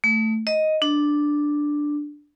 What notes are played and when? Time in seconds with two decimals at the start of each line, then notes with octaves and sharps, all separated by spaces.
0.04 A3
0.47 D#5
0.82 D4